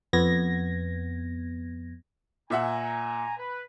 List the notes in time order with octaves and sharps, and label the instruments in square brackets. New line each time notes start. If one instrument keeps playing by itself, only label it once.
[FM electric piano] F2 B3 G#6 A#6
[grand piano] A#2 E5 F#5 [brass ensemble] G#5 A#5
[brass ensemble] B4